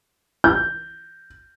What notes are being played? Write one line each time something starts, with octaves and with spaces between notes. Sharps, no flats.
G6